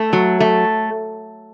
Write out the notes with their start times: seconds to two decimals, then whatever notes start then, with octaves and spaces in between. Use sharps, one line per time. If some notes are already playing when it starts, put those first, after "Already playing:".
Already playing: A3
0.13 F#3
0.40 A3